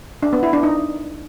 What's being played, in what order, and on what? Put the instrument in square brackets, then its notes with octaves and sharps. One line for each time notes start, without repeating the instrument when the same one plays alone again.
[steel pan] D4
B3
E4
D4
D#4